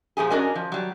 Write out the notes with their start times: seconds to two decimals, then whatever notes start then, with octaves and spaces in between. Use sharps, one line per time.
0.17 A#2 F3 G4 G#4
0.30 C#4 D4 F#4 A#4 D#5 G#5
0.55 F3
0.72 F#3 G3